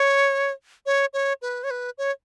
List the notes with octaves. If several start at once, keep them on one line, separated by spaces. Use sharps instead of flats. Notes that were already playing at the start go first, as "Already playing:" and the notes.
Already playing: C#5
C#5
C#5
B4
C#5
B4
C#5